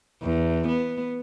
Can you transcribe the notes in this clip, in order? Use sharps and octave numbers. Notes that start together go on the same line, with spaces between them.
E2
B3